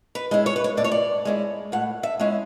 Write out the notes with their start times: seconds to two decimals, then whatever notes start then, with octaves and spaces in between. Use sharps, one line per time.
0.15 B4
0.31 G#3 C#4 E4
0.46 C#5
0.56 B4
0.64 C#5
0.77 A2 D5
0.84 C#5
0.92 D5
1.25 G#3 C#4 E4
1.72 A2 F#5
2.03 E5
2.19 G#3 C#4 E4